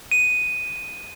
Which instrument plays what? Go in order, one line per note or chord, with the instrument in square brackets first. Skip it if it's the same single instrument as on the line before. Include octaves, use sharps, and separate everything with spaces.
[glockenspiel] D#7